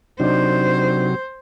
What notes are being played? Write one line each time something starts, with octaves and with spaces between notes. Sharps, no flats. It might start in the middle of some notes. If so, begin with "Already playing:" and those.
C3 F#3 D4 D#4 C5 D5